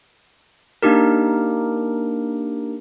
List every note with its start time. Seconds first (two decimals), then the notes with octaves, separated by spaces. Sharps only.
0.82 A#3 D4 D#4 G4 A#4